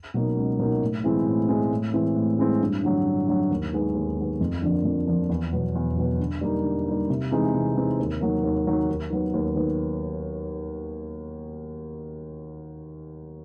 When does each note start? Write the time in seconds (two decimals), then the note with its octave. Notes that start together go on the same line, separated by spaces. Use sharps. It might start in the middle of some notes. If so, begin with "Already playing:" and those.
0.14 B2 F#3 A#3 D#4
0.37 C#2
0.59 B2 F#3 A#3 D#4
0.81 A2
1.04 E3 G#3 C4 E4
1.26 A2
1.49 E3 G#3 C4 E4
1.71 A2
1.93 E3 G#3 C4 E4
2.16 A2
2.39 E3 G#3 C4 E4
2.61 G2
2.83 D3 F#3
3.05 G2
3.27 D3 F#3
3.51 D#2
3.73 D#3 G#3 B3
3.95 D#2
4.17 D#3 G#3 B3
4.40 F2
4.62 D3 F3 A#3 D4
4.85 F2
5.08 D3 F3 A#3 D4
5.29 E2
5.53 B2 F#3 B3
5.75 E2
5.97 B2 F#3 B3
6.20 D3
6.41 G3 A#3 D#4
6.64 D3
6.86 G3 A#3 D#4
7.10 C3
7.31 E3 G#3 C4 D#4
7.54 C3
7.76 E3 G#3 C4 D#4
7.99 D#2
8.21 D#3 F#3 A#3
8.43 D#2
8.67 D#3 F#3 A#3
8.89 D#2
9.10 D#3 F#3 B3
9.34 D#2
9.56 D#3 F#3 B3